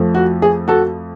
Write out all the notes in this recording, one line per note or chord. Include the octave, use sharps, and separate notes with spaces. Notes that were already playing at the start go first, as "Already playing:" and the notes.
Already playing: F2 F3 A3
F#4
G#4
F#4 A4